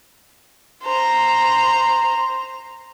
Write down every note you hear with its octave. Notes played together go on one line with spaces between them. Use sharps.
C5 A#5